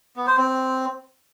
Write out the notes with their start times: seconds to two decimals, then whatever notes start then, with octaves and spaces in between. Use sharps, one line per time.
0.16 B3
0.27 C5
0.38 C4